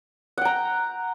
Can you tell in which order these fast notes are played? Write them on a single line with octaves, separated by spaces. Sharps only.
F#5 G5 A#5